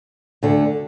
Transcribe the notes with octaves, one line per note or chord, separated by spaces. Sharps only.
D2 D3 A3